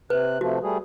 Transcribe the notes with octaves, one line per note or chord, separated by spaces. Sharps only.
C3 B4 F#6
C3 F3 A3 F#4
G3 A3 G#4